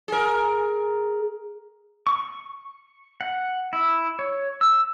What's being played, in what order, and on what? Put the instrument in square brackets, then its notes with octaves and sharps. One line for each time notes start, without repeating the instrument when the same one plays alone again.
[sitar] G#4 A#4
[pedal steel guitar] C#6
F#5
E4
C#5
E6